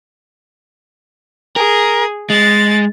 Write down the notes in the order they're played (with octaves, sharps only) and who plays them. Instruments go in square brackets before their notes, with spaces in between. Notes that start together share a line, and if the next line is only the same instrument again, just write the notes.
[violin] G#4 [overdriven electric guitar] A#4
[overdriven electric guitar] G#3 [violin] A6